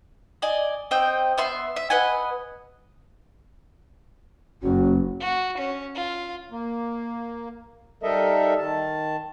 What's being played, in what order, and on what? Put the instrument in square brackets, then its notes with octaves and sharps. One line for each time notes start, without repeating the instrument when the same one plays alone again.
[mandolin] D5 D#5 G#5
C4 D#5 G5
B3 E5 C6
E5
B4 D#5 F#5 G#5
[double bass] F#1 [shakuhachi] C#4 [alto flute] F#4
[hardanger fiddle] F#4
C#4
F4
[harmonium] A#3
G3 D#4 A4 A#4 D#5 E5
D#3 A5